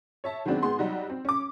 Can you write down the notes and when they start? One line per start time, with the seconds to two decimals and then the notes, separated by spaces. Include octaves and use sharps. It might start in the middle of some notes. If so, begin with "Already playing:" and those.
0.24 C#5 E5 A5
0.45 D#3 F#3 G#3 B3 C4 D4
0.63 G#2 G#3 B3 G#4 C6
0.78 F#3 G3 D#4 F#4
1.10 C4
1.25 C#4 D6